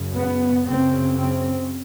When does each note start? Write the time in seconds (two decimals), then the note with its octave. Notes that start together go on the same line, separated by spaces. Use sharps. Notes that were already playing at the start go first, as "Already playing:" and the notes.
Already playing: F#2 C#3
0.15 B3
0.66 F#2 C#3 C4
1.16 C4